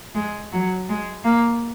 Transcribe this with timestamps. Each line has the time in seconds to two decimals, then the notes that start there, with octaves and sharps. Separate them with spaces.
0.14 G#3
0.52 F#3
0.89 G#3
1.24 A#3